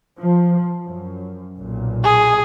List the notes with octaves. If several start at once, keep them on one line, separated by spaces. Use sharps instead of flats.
F3
F#2
B1 A#2
G#4